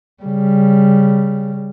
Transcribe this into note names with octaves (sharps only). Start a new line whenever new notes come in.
C#3 G3